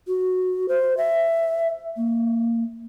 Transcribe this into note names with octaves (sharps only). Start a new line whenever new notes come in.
F#4
C5
E5
A#3